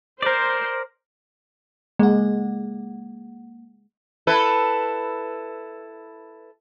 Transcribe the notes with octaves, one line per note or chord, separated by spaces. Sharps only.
A#4 C5 D5
G#3 A#3 F#5
E4 A4 B4